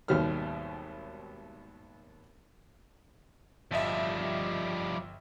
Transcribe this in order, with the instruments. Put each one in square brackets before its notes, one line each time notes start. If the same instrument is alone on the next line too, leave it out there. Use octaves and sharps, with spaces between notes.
[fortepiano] G#1 D#2 B2 F#3 G3 F6
[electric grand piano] G1 D#5 E5 [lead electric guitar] F3 G3